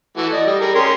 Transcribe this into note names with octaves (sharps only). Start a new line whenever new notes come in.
E3 A3 F#4
D5 D#5
G3
G3 G#4 A#4
C#4 A#4 C6